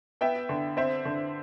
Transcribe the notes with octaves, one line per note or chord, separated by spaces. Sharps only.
B3 E5 G5
D3
C4 C5 E5
D3